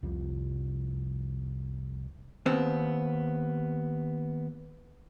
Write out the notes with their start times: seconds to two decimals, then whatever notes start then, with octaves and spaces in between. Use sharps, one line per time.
0.03 C2 F2 C3 F3
2.46 D#2 B3 C4